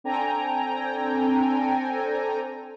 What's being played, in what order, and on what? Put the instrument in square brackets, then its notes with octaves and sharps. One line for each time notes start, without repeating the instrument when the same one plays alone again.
[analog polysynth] C4 D4 A4 G5 G#5 A#5